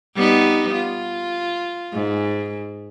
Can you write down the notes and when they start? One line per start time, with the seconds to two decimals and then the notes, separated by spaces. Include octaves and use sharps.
0.16 G3 B3 D#4
0.74 F4
1.93 G#2